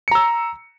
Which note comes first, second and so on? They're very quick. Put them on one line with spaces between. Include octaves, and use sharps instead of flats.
C#7 A#5 E6